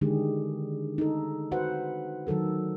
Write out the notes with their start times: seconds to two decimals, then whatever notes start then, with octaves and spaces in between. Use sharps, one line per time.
0.01 D3 D#3 G#3 D4 G4 G#4
0.98 D#4 A4
1.51 F#4 B4 C5 F#5
2.27 D#3 F#3 A4 A#4